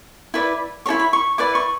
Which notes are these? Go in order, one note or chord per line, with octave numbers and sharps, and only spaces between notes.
E4 B4 D5
E4 A4 C#5 C#6
B5
C#6
E4 B4 D5 D6
C#6